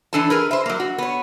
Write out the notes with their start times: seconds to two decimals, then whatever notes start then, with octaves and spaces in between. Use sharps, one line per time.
0.13 E3 D4 A4 G#5 A5
0.30 G#4 A#4 B4
0.51 C5 E5
0.66 F#3 A#3
0.80 F#4
0.98 B3 C#5